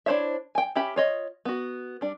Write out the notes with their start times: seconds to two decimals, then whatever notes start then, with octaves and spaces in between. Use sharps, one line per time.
0.06 D4 E4 C5 C#5 E5
0.55 G5 G#5
0.75 C#4 G4 E5 G5 B5
0.96 F4 C#5 D#5
1.45 B3 F#4
2.01 G3 D4